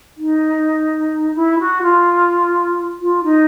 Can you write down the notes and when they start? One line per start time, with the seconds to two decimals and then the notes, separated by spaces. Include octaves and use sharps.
0.17 D#4
1.35 E4
1.59 F#4
1.82 F4
3.00 F4
3.24 D#4